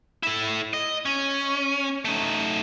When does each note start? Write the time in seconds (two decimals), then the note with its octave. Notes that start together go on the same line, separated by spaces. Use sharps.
0.23 E4 A4
0.73 D#5
1.05 C#4
2.05 A3 D#4